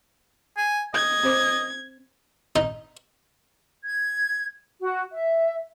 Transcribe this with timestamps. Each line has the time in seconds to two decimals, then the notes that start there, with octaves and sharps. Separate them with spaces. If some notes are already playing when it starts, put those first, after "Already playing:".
0.57 G#5
0.94 D#5 G#6
1.23 C4 C5 D6
2.56 D#4
3.84 G#6
4.81 F#4
5.13 E5